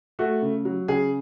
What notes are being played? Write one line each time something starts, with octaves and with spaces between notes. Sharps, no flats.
A3 F#4
C#3
F#3
C#3 G#4